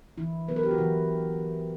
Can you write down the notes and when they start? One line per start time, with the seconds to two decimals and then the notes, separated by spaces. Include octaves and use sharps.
0.18 D3 E3 E4
0.48 F#3 B3 B4
0.56 A#4
0.63 G4
0.71 F#4
0.78 D3 E3 E4